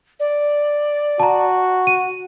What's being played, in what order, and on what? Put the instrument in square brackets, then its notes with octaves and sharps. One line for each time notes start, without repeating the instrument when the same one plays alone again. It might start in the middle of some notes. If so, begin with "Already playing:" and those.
[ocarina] D5
[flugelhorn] F#4 [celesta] A5 A#5
[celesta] D#7